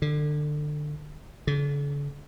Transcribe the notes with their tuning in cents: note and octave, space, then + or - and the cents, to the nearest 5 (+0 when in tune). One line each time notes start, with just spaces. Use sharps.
D3 +25
D3 -45